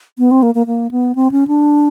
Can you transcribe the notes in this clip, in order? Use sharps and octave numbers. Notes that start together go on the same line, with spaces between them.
B3
C4
A#3
A#3
A#3
B3
C4
C#4
D4